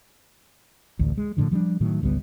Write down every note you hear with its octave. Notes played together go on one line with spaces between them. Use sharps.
A1 D2
G#3
A2 D3 F3
F3 G3 B3 D4
A2 D#3 F#3
G#1 C#2 G3 B3